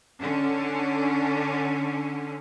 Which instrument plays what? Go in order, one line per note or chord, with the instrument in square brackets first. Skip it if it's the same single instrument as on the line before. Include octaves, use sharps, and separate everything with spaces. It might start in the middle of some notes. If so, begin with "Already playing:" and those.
[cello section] D3 C#4